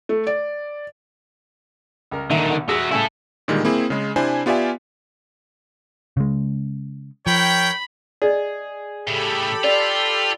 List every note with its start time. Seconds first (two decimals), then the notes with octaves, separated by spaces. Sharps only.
0.09 A3
0.27 D5
2.11 C#2 A#4
2.30 A#2 D3 D#3 E5
2.50 B1
2.69 F#4 G#4 E5
2.91 C#3 A3 E4 A4 G#5
3.48 A#2 D3 D#3 G3 G#3
3.65 A#3 C4 E4 G#4
3.90 C#3 G#3
4.16 C3 D4 E4 C5 G#5
4.46 B3 F4 G4 D5 E5 G#5
6.17 C#3 G#3
7.27 F3 A#4 C#5 G5 B5
8.22 G#4 D5 D#5
9.08 A2 C#3 G4 A4 B5
9.64 F4 D5